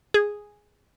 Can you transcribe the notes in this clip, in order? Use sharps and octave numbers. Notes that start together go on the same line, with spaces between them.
G#4